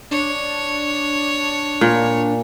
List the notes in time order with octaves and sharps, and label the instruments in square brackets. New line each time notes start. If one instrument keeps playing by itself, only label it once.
[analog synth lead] D4 [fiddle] C#5
[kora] A#2